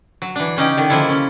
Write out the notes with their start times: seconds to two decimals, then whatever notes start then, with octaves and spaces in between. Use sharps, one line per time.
0.22 F#3
0.36 E3 D4
0.57 C#3 C#4 D#4 G4
0.77 D3 D#3
0.90 C#3 F3 A#3 E4 A4
1.09 C#4